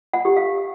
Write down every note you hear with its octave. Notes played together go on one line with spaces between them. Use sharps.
F#5
G4
F5